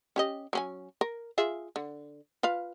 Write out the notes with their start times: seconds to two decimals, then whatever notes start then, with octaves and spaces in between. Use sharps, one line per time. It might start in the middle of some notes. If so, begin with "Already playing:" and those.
0.16 C#4 G4 D#5
0.53 F#3 C#4 G#5
1.01 A#4
1.38 F4 G#4 E5
1.76 D3
2.43 F4 B4 F5